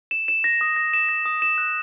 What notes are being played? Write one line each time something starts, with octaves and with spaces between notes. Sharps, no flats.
E7
E7
A#6
D#6
A#6
E7
A#6
D#6
E7
F#6